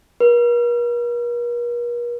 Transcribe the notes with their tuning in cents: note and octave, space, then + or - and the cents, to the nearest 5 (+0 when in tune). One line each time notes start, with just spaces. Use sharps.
A#4 +45